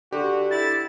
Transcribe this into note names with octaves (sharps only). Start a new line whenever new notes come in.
D3 F#4 G4
E4 A6